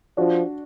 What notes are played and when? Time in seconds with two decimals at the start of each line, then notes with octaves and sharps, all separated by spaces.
0.17 F3 D4 F#4